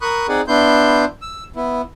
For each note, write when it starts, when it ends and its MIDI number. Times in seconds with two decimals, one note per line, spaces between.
0.02 0.27 70
0.02 0.27 83
0.02 0.27 85
0.02 0.27 87
0.02 0.27 90
0.28 0.41 60
0.28 0.41 63
0.28 0.41 68
0.28 0.41 74
0.28 0.41 78
0.48 1.05 59
0.48 1.05 62
0.48 1.05 64
0.48 1.05 84
0.48 1.05 91
1.22 1.44 88
1.56 1.82 59
1.56 1.82 64